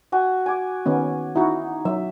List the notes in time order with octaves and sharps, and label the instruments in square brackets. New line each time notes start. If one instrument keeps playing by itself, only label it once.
[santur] F#4 G#5
G#5 D6
[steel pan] D#3 B3 C#4
[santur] D#4 [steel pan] E4 F#4
[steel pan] F#3 [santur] E5